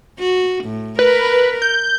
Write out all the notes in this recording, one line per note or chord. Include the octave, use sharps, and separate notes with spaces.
F#4
A2
A#4 B4
G6